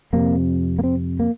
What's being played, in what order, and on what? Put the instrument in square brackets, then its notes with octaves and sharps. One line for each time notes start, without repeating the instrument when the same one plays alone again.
[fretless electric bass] F2 C3 A#3
A#3
C4
A#3